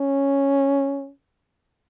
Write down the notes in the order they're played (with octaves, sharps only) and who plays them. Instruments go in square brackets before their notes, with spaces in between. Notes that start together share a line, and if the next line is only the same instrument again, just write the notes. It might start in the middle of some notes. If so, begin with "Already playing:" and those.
Already playing: [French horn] C#4